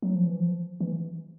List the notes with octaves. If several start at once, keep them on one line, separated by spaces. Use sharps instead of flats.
F#3
F3
E3
F3
E3